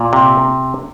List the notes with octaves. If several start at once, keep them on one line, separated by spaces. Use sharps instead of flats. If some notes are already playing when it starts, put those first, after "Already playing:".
Already playing: A#2
C3